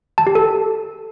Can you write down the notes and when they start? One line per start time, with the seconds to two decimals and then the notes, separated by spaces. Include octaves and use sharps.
0.18 A5
0.27 G4
0.35 A4